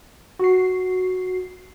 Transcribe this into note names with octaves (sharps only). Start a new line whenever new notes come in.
F#4 C7